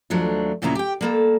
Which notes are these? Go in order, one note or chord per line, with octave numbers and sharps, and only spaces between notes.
D#2 F3 F#3 A3 D4
D2 A#2 C#3 A#3 E4 A#5
G4 G5
G3 A#3 A4